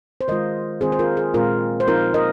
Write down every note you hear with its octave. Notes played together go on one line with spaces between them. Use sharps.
C5
D#3 G#3 F4 A#4 D#5
D#3 G#3 C4 F4 G#4 C5
C5
F4 A#4
G#4
A#2 G#3 C4 F4 A#4
C5
F3 C4 D#4 F4 A#4
A#4 D#5